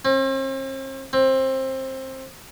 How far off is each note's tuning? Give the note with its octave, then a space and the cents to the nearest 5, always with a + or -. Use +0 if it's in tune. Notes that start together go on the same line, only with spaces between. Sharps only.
C4 +45
C4 +20